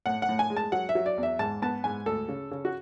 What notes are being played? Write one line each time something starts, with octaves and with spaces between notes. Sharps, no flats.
A2 F#5
F#5
A2
G#5
G#3
A5
F#3 F#5
E5
F#3
D5
E2
E5
G#2 A5
B3 A5
G#2 G#5
D2 A4
C#3
C#3
F#4